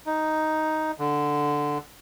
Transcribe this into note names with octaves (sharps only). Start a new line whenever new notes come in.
D#4
D3